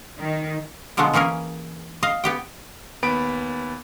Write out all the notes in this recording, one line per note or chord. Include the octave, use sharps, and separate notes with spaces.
D#3
B2 D3 F3 F#3 G#3 B3
E3 A#3 C#4 G#4 A#4
D#5 F5
B3 G4 G5
D#2 B3 B5 D7